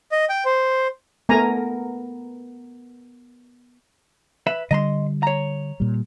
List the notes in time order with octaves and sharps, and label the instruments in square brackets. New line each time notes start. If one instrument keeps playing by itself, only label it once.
[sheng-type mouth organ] D#5
G5
C5
[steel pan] A3 G#5 A#5 [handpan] B3 A#4
[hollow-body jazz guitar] B4 E5 B5
[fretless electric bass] D3 G3 [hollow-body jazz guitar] D#5 A#5 C6
[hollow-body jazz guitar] C#5 A#5
[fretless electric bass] A#2 G3